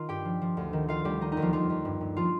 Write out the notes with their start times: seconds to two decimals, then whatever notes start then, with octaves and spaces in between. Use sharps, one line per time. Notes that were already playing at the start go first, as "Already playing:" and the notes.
Already playing: D#3 D#4 F4 F5
0.09 G2 G4 G5
0.25 F3
0.42 F3
0.57 D2
0.73 D#3
0.88 D#3 F4 F5
1.05 D2 G3 G4
1.21 D#3 D#4
1.32 D#4
1.37 D#2
1.42 F3 F4
1.53 D#2 F3 F4
1.70 D#2
1.85 G2
2.01 G2
2.17 F3 F4